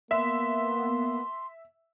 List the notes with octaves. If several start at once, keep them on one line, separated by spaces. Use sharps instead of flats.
A#3 B3 E5 C6